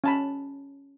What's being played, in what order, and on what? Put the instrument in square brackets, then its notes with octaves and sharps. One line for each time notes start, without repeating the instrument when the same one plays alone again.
[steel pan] C#4 A5 B5